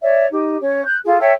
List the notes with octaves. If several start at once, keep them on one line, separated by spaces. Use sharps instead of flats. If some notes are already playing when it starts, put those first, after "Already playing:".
C#5 D5 E5
D#4 G4
C#4 C#5
F#6 G6
F4 G#4 A4
A4 C#5 E5 G5